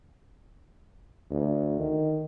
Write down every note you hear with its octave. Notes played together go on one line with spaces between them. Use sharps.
D2
D#3